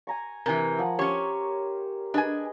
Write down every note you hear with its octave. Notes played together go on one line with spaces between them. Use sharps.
G#5 A#5 C#6
C3 E3 A#4 G#5
F3 F#5
C#4 G4 C5 C#5
D4 G#4 B4 D#5 G#5